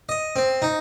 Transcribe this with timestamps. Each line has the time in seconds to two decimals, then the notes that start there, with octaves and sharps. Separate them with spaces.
0.09 D#5
0.36 C4
0.62 D#4